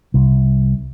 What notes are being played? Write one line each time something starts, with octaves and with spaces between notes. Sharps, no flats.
C2